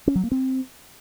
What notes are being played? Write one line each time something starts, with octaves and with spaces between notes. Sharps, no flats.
C#4
F#3
A#3
C4